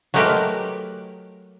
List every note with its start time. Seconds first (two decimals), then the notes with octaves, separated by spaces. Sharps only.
0.14 F#3 G#3 A3 G4 A#4 B4